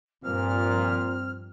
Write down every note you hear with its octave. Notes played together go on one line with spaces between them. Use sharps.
G2 A#2 F3 C4 F6